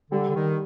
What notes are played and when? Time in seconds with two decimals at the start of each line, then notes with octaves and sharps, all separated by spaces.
0.11 D3 G3
0.28 D3
0.35 D#3